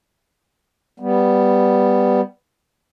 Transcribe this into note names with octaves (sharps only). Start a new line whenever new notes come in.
G3 B3